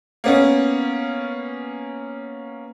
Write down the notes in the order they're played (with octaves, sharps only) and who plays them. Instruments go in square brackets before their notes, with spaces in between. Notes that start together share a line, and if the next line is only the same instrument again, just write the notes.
[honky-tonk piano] A#3 B3 C#4